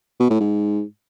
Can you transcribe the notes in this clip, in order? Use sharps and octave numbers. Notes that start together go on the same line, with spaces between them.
B2
A2
G#2